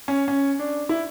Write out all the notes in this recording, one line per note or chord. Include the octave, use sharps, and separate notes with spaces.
C#4
C#4
D4
E4